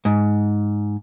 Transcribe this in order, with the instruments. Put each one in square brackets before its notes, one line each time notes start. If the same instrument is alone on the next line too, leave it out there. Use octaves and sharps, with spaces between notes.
[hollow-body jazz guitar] G#2